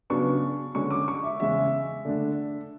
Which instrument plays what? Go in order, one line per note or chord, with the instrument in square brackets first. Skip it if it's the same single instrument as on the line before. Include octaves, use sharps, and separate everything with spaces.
[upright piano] C#3 F#3 B3 D4 C#6
D3 G#3 C#4 C#6
D6
C#6
E5
E2 C#3 G#3 E5
D3 A3 D4